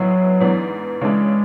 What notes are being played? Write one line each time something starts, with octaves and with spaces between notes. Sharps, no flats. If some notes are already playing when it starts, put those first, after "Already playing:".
Already playing: A2 F#3 G#3 B3 E4
G#2 E3 B3 D4
C#3 E3 G#3 A3 D4